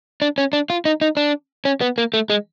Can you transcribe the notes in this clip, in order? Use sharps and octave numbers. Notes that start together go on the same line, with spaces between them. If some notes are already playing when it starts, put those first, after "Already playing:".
D4
C#4
D4
F4
D#4
D#4
D4
C#4
B3
A#3
A3
G#3